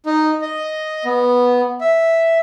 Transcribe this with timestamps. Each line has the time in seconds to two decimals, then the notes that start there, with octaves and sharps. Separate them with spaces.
0.06 D#4
0.42 D#5
1.05 B3
1.81 E5